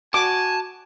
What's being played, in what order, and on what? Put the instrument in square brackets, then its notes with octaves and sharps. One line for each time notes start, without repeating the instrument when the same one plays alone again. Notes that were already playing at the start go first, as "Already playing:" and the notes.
[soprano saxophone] F#4 [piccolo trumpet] G#5 [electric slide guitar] A5 [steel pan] D6